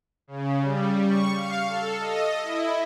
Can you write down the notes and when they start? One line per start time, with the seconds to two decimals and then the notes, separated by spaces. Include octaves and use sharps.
0.27 C#3
0.62 G3
1.06 C#6
1.35 F5
1.68 A4
1.98 D#5
2.42 E4